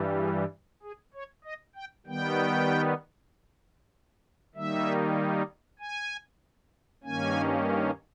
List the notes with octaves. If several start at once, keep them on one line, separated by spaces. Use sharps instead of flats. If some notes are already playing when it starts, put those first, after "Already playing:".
Already playing: G2 E3 G3
G#4
G#4
C#5
D#5
G5
D#3 G3 B3 G5
D#3 G3 A#3 D#4 E5
G#5
G2 D#3 A#3 C#4 G#5